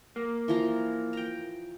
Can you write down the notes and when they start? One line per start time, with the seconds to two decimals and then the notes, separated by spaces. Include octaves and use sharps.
0.16 A#3
0.48 E3 F3 A#5
1.13 G5 A#5